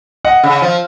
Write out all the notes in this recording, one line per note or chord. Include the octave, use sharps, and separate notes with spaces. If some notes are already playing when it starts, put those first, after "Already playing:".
D#5 F#5
C#3
F3